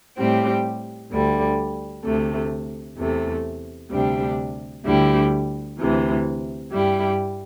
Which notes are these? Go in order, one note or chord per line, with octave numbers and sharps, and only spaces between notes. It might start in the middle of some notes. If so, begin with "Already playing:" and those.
A2 G3 C4 G4
D2 D3 G3
D2 C3 A3
E2 C3 A3
D2 C3 G3 D4 G4
D2 D3 G3 E4 G4
D2 C3 E3
G2 G3 E4 G4